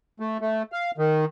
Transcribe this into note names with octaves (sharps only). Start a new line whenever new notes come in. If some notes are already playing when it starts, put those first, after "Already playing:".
A3
A3
F5
D#3